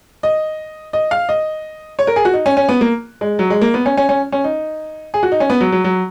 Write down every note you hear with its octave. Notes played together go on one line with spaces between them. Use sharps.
D#5
D#5
F5
D#5
C#5
A#4
G#4
F#4
D#4
C#4
C#4
B3
A#3
G#3
F#3
G#3
A#3
B3
C#4
C#4
C#4
C#4
D#4
G#4
F#4
D#4
C#4
B3
F#3
F#3
F#3